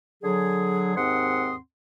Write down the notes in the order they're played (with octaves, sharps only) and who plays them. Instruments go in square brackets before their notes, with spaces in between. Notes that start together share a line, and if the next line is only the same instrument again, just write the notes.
[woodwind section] D3 F#3 G#4
D#2 G#2 C4 F#5 C6 D#6